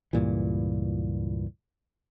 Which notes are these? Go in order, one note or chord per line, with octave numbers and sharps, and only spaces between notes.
C#2 G2 A#2 E3